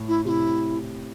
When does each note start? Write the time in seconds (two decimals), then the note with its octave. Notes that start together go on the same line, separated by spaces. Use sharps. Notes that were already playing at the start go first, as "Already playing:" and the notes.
Already playing: A2
0.08 E4
0.25 C3 F4
0.29 E4